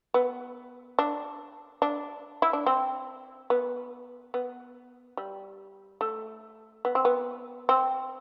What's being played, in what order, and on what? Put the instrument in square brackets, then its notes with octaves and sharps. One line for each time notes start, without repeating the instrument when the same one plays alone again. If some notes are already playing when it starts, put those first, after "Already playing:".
[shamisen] B3
D4
D4
E4
D4
C4
B3
B3
G3
A3
B3
C4
B3
C4